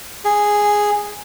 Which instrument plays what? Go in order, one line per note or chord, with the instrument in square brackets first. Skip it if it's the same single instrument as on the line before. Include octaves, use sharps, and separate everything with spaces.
[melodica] G#4